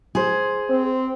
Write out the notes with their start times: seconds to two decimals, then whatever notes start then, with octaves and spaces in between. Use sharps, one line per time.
0.15 G#4 C5
0.70 C4